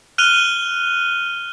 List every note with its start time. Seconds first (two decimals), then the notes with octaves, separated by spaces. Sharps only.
0.18 F6 F#6 D#7 F7 G7